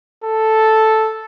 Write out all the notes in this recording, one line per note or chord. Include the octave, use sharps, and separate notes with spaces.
A4